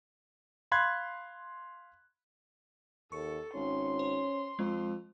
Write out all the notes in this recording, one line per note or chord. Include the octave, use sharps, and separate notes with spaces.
F5 B5 C6 F#6 G#6
D#2 A4 C#6 C#7
G#1 C#4 C6
C5
F2 G#3